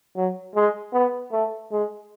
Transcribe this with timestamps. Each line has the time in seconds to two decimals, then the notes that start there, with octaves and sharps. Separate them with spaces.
0.16 F#3
0.55 G#3
0.93 B3
1.32 A3
1.72 G#3